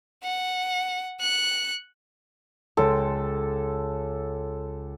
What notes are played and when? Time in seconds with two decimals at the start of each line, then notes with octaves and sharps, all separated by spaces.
0.23 F#5
1.21 F#6 C#7
2.77 C#2 A4 G5 C6